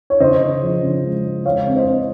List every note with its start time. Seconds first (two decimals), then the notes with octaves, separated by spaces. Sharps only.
0.10 C#5
0.20 C#3 C5 D#5
0.40 C#3
0.62 F3
0.83 C#3
1.03 G#3
1.25 G#3
1.45 G#3 C#5 F5
1.67 C4
1.76 C5 D#5
1.87 C4